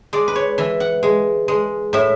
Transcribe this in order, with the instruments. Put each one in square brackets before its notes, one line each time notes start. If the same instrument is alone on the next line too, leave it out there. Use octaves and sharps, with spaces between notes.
[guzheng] G#3 D5
B4
C#5
E3 E5
F#5
G#3
G#3
A2 E5